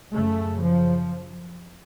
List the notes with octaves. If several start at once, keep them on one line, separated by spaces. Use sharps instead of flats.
F#2 C#3 A3
F3